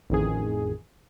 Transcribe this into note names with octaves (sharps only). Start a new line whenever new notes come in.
A1 F2 D#3 G#4